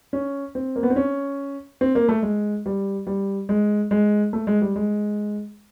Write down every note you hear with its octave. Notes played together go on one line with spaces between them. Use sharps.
C#4
C4
A#3
B3
C4
C#4
C4
A#3
A3
G#3
G3
G3
G#3
G#3
A3
G#3
G3
G#3